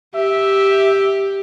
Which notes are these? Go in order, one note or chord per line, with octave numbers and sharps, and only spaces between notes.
G4 E5